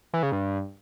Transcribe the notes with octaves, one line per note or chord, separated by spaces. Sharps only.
E3
C#3
G2